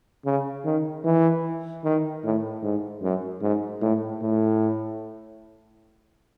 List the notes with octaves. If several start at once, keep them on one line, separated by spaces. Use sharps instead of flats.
C#3
D#3
E3
D#3
A2
G#2
F#2
G#2
A2
A2